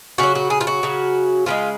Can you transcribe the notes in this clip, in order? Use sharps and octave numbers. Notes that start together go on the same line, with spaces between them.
C#3 F#3 F#4
F#4
G#4
F4
F#4
C#3 F#3
C#3 F3 G#3 F4